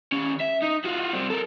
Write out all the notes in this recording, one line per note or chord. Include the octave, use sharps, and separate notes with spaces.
D#3 C#4
E5
D#4
F4 F#4
G3 C4
A4 A#4